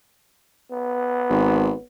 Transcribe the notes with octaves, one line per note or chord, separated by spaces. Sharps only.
B3
G#1